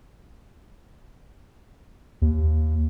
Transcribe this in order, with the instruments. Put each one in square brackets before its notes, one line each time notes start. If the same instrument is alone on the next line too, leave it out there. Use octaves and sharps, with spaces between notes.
[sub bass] D#2